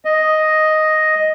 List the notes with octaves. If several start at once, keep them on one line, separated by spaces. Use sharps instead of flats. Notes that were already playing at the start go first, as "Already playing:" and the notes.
D#5